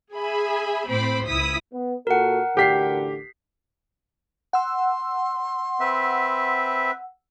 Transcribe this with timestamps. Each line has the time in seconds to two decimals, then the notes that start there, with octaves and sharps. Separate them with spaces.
0.14 G#4 E5 G#5 B5
0.87 A2 C4 C5 B5 D6
1.27 C#2 E4 D#6 B6
1.73 B3
2.07 A#2 F#4 A4 A#4 F#5
2.57 A1 D2 D3 G4 B6 C7
4.53 F#5 C6 E6
5.80 C4 B4 E5